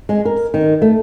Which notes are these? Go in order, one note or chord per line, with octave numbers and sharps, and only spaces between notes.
G#3
A#4
D#3
A3